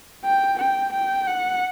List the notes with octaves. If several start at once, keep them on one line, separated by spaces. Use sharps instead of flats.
G5
G5
G5
F#5